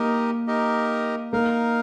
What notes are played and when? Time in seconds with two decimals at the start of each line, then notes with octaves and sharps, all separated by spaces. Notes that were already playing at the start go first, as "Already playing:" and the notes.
Already playing: A#3 D#4 G4 A#4 D#5
0.47 D#4 G4 A#4 D#5
1.32 A#3 D#4 A#4 F5